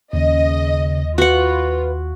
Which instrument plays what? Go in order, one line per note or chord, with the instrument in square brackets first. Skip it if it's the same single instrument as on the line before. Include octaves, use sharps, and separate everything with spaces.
[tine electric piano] D#2 [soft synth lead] C#3 [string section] D#5
[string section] F4 [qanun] F#4 F#5 [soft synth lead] B4